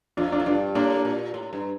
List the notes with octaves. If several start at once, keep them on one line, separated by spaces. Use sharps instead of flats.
F2 D4 F4
D4 F4
A2
G2 D4 F4
A2 A#3 D4
A#2
A2
G2